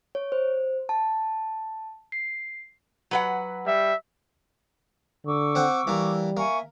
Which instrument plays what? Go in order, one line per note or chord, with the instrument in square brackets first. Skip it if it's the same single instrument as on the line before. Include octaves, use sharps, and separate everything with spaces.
[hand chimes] C#5
C5
A5
C7
[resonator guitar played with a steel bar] F#3 B4 F#5
[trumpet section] G3 E5
[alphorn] D3 [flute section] C#6 D6 E6
[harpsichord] C4 F#5 G5
[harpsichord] E3 A#3 [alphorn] G3
[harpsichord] A#3 [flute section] E5 G#5 C#6